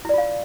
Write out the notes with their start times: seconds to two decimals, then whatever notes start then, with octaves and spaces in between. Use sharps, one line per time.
0.05 E4
0.09 D5
0.14 F4
0.18 F5